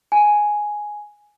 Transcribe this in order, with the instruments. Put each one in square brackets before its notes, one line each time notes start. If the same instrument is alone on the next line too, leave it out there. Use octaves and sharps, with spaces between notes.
[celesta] G#5